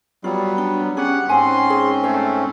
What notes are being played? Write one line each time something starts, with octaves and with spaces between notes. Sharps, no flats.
F#3 G3 B3 F4
D4
C#4 G4 G#4 F#5
G#2 C4 C#4 G#5 C6
G#4
A3 C#5